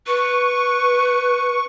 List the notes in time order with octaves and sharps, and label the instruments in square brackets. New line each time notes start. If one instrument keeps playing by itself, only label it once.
[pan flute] B4 [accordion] C#6